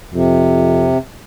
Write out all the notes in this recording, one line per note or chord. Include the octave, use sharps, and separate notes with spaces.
F2 C3